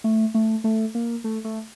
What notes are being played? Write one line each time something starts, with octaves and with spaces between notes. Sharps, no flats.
A3
A3
A3
A#3
A3
A3